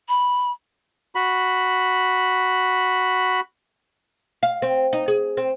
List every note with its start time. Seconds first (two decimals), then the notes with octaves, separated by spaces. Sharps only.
0.09 B5
1.15 F#4 B5
4.43 F5
4.62 C4
4.93 D#4
5.08 G#4
5.37 C4